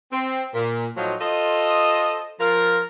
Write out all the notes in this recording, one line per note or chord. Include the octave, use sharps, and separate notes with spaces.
C4
A#2
A2 F3 F#3 D#4 F4
F4 A4 C5 D#5
F3 F4 A#4